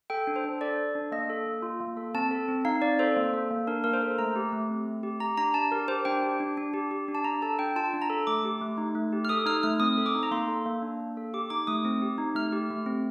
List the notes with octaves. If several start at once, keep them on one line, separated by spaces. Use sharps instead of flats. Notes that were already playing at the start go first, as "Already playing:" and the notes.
A4 G5
D4
C5
D4
A4 D5
A4
D4
A#3 D#5
A4
A#3
F4
A#3
A4
C4 A5
A4
C4
D#4 F5
C4 D5
A4 C5
A#3
A4
A#3
D4 A#4
A#3 A#4
C5
A4
A3 A#5
G4
A3
C4
A3
G4
G4 A#5
D4 A#5
D4 A5
G4 A#4
G4 C5
D4 G5
G4
D4
D4
G4
G4
D4
A5
D4 A#5
A4 A5
D4 G5
F4 A5
D4
A#5
A4
A3 D6
G4
A3
D#4
A3
G4
F6
A4 D#6
D#4 F6
A3 F6
C4 D#6
A4
D6
D#4
A#5
A#3 C6
A4
A#3
D4
A#3
A4
G4 D6
D#4 D6
A3 D#6
C4
G4
D#4
A3 F6
G4
A3
C4